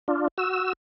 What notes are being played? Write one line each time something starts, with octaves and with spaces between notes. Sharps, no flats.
D4 F4
F#4 E6